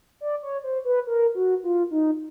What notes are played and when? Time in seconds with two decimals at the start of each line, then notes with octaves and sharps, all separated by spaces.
0.21 D5
0.43 C#5
0.64 C5
0.85 B4
1.07 A#4
1.35 F#4
1.63 F4
1.91 D#4